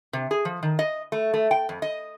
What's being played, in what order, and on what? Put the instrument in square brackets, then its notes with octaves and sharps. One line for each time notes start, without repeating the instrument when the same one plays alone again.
[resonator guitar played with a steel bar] C3
G#4
F3
D#3
D#5
A3
A3
G5
F2
D#5